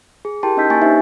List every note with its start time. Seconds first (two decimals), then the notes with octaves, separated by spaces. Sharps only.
0.25 G#4
0.43 E4 G4 A#4 G5 A5 C6
0.57 C#4 D#4 D#5 E6 G6 B6
0.70 A#3 G#5 C#6 A6
0.82 D4 D#4 G4 B4 C5 E5